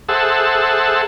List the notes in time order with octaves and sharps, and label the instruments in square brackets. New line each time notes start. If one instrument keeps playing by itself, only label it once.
[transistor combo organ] G#4 A4 C5 E5 F#5 A5